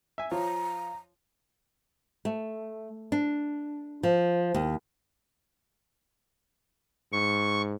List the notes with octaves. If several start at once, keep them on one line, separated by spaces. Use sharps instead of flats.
E5 G#5
F3 F4 C#5 A#5
A3
D4
F3
D#2
G#2 C#6